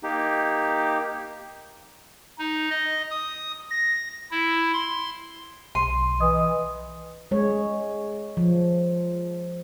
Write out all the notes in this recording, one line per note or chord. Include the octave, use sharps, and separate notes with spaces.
A#3 D#4 G4
D#4
D#5
D#6
A#6
E4
C6
B1 C6 D#7
E3 D#5 D#6
G#3 C#5
F3